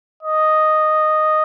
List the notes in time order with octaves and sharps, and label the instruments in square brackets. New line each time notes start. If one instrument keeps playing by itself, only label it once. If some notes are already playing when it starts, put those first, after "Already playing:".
[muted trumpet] D#5